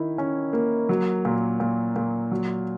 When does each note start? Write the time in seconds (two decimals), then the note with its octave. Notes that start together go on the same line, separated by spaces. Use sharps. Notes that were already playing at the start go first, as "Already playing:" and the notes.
Already playing: D#3 E4
0.18 C#4
0.53 A#3
0.89 F#3
1.25 A#2
1.60 A#2
1.96 A#2
2.31 F#3